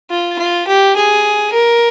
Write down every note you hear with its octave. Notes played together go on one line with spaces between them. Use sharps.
F4
F4
G4
G#4
A#4